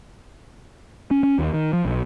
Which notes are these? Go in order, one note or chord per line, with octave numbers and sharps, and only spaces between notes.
C#4
C#4
D#2
D#3
F3
B1